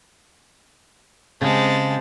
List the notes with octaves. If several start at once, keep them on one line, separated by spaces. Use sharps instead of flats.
C#3 G#3 C4 G4 A5